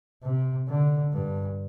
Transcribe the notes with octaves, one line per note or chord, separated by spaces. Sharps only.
C3
D3
G2